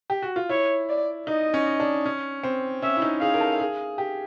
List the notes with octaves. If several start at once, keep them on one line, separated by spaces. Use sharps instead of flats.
G4
F#4
F4
E4 C#5
D5
D#4 D#5
C#4
D4
C#4
C4
C#4 E5
E4
D#4
G#4 F5
A#4
A4
G#4
G4